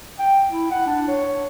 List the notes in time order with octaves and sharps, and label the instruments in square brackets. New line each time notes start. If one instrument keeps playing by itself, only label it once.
[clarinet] G5
E4
F#5
D4
C#5